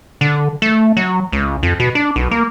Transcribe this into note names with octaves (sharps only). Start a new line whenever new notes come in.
D3
A3
F#3
C#2
F2
B2
D4
B1
A#3